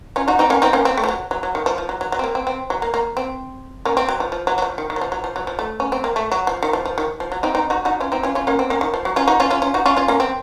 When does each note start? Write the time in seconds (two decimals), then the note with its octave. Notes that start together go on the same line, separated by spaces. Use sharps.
0.16 C#4 F4
0.28 D#4 F#4
0.39 C4 D#4
0.50 A#3 C#4
0.62 C4 D#4
0.73 A#3 C#4
0.85 C4
0.97 A3
1.04 F3
1.08 F#3
1.31 F#3
1.43 F#3
1.55 D#3
1.66 F3
1.78 F3
1.89 F#3
2.01 F#3
2.12 F#3
2.19 C4
2.24 A#3
2.35 C4
2.47 C4
2.70 F#3
2.82 A#3
2.94 A#3
3.17 C4
3.85 A#3 C#4
3.97 C4
4.09 F#3
4.20 F3
4.32 F3
4.47 F#3
4.58 F#3
4.62 F3
4.78 D#3
4.90 D#3
4.96 F#3
5.01 F3
5.12 F#3
5.24 F3
5.36 F#3
5.47 F3
5.59 A3
5.80 C#4
5.92 C4
6.04 A#3
6.16 A3
6.32 F#3
6.47 F3
6.63 D#3
6.73 F3
6.85 F3
6.98 D#3
7.20 F3
7.32 F#3
7.43 C4 D#4
7.55 C4 D#4
7.70 D#4 F#4
7.85 D#4 F#4
8.00 C#4 F4
8.12 C4 D#4
8.23 C#4 F4
8.35 C#4 F4
8.47 A#3 C#4
8.59 C4
8.70 A#3 C#4
8.81 D#3
8.94 F3
9.05 F#3
9.16 C#4 F4
9.28 D#4 F#4
9.40 C#4 F4
9.50 C#4 F4
9.62 C#4 F4
9.74 D#4 F#4
9.86 C#4 F4
9.97 C#4 F4
10.08 A#3 C#4
10.20 C4